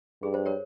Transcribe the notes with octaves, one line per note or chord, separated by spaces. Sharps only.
G2 G#4
C5
A#4 C#5